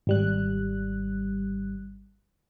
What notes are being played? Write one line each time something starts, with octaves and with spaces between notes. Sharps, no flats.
G#1 G3 F#6